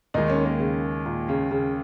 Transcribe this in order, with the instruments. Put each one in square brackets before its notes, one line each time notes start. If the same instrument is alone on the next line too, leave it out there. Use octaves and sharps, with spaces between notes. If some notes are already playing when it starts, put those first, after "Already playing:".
[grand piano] D#2 D#3 G#3 [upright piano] D#4
[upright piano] C#4
A#3
C#3
A#2
C#3
C#3